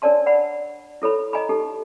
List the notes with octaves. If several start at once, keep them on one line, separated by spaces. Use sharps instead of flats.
D4 A#4 C#5 D5 A5 C6
D5 F#5 B5
E4 A4 C#5 B5
D#5 G#5 A#5 B5
D#4 G4 A4